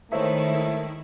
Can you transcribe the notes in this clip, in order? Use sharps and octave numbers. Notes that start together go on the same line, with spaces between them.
D#3 G#3 A3 E4 C5 C#5 E5